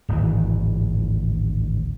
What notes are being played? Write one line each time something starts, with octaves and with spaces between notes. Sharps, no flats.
D1 G#1 D#3 E3